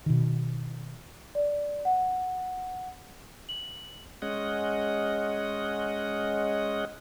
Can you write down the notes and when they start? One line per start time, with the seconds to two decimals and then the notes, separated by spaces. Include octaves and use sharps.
0.06 B2 D#3
1.35 D5
1.85 F#5
3.49 F#7
4.22 G#3 C#4 D#5 F#5